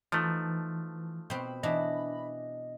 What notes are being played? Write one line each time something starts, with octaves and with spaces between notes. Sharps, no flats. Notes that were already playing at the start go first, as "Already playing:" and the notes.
E3 F3 A3 D#4
B2 C4 B5
B2 E3 D4 D#5